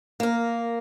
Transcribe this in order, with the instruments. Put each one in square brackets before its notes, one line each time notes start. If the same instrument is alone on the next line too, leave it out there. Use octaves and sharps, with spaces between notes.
[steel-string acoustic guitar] A#3 A#4